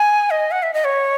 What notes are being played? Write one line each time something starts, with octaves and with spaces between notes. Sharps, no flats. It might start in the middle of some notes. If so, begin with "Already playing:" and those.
Already playing: G#5
D#5
F#5
E5
D#5
C#5